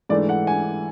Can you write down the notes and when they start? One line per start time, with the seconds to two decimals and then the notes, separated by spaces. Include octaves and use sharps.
0.09 G#2 E3 A3 D4 D5
0.29 F#5
0.47 G#5